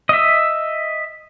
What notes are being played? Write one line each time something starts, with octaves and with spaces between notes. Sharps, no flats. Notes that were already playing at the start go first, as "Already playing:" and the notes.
D#5 E5